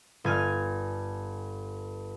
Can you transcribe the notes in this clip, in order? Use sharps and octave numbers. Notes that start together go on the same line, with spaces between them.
G1 G#5 F6